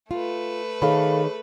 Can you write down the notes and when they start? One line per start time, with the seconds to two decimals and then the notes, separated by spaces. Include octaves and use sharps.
0.11 A3 F4 B4
0.82 D#3 G#4 A4 C#5 F5 B5